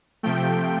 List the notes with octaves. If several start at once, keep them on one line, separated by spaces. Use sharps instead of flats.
C3 F3 A3 G5